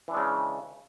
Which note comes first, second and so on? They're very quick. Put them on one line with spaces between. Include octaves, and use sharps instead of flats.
E3 D4 G#3 C#3